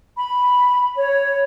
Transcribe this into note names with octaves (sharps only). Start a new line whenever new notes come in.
B5
C#5